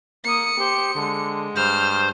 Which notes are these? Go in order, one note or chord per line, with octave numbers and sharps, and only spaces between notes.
A#3 D#6 C#7
G4 C5
D3 G#3
G2 C5 F6